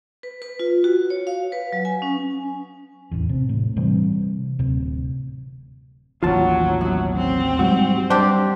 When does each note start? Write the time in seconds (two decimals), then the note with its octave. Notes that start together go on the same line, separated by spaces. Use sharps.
0.23 B4
0.42 B4
0.60 F4
0.84 F#4
1.10 C#5
1.27 F5
1.52 B4
1.72 F#3
1.85 G#5
2.02 C#4
3.11 A1 E2
3.29 C3
3.49 A2
3.76 C3 E3 G3
4.59 D1 C3
6.23 A1 D#2 F3 F#3 F4 A5
6.81 F#2 B2 F#3
7.15 C4
7.59 G#2 F#3 G3 F#4
8.10 G3 D4 G4 C5